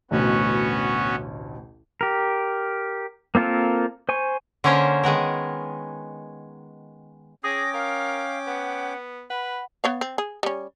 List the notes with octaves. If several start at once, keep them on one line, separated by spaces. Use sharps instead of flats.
A1 D2 B2 B3 C#4 F#4
G4 A#4
A#3 C4 F4 A4 A#4
C5 G#5 C#6
D3 A#3 C#4 A#4 C5 C#5
D#3 G#3 B3 A#4
C#4 G#4 G5 D6 D#6 A#6
A#4 F5
B3 F#5
B4 F#5 B5
B3 C#5 F5
C4
G#4
G3 C#4